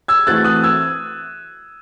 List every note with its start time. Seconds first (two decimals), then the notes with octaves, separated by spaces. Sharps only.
0.08 E6 G#6
0.27 E3 A3 C4 F#4 A4 F#6 A6
0.44 D#6 F#6
0.64 E6 G#6